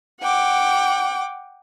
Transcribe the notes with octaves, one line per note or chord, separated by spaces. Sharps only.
F#5 G5 D6